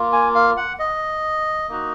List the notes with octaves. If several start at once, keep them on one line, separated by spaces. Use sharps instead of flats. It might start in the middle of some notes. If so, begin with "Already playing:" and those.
Already playing: A#3 F4
G#5
F5
F#5
D#5
A#3 D#4 F#4